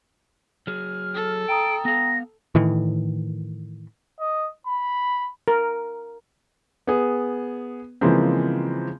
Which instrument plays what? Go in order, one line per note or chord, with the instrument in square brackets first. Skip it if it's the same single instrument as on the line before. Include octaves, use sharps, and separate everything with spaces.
[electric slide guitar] F#3 G#4 [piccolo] F6
[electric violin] A4
[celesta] G5 A#5 D#6 [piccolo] D7
[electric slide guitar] B3 F5 [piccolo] A#6
[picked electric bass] A2 D#3 E3
[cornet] D#5
B5
[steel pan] A#4
[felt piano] B3 G#4
C#3 E3 F3 G#3 A#3 C4